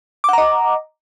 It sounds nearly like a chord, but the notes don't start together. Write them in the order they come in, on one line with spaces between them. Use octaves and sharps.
D6 F#5 A#5 D#5